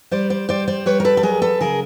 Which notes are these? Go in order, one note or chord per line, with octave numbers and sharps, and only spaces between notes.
G3 C5 D5
C5 D5
G3 C5 D5
C5 D5
G3 B4 C#5
A#4
A4 B4
A4
F#3 G#4 A#4
A4 B4
C#3 G#4 A#4